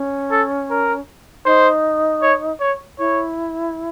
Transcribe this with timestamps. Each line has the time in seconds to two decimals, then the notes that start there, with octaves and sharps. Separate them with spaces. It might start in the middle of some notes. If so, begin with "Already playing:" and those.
Already playing: C#4
0.31 A4
0.70 A#4
1.46 D#4 C5
2.22 C#5
2.60 C#5
2.99 E4 C#5